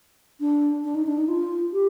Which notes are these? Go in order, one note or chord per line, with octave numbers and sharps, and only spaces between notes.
D4
D4
D#4
D4
D#4
F4
G4